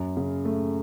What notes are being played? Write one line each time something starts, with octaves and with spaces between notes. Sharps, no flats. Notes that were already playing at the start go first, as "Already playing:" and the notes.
Already playing: F#2
C#3
A3